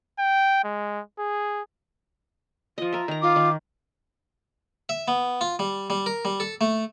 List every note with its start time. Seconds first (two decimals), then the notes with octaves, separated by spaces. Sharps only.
0.19 G5
0.64 G#3
1.19 G#4
2.78 F3 F4 D#5
2.93 A#4 E5
3.08 D#3 A#5
3.22 F4 D6
3.36 D#3
4.89 E5
5.08 B3
5.41 F4
5.59 G3
5.90 G3
6.06 A#4
6.25 G3
6.40 A4
6.61 A3